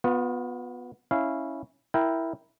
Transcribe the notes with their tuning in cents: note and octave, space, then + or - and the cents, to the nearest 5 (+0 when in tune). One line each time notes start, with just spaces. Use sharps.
B3 +0 F4 +40
C#4 +0 E4 -15 F5 -15
E4 +0 A#4 +0 G5 +0